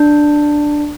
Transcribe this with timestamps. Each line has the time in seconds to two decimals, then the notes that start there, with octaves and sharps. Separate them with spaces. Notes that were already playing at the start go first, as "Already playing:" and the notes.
Already playing: D4